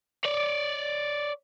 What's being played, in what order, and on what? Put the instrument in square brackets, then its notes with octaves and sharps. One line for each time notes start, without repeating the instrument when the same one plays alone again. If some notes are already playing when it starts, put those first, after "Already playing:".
[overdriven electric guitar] C#5 D5